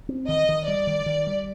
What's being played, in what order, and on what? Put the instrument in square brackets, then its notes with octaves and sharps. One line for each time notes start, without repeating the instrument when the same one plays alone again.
[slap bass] C4
[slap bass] D#3 [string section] D#5
[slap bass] D#3
[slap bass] G3 [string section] D5
[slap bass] D#3
D#3
G3